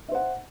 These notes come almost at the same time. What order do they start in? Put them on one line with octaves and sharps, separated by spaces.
E5 C5 F#5